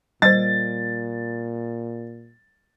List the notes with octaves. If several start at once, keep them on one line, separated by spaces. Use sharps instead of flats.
A#2 G3 C5 A6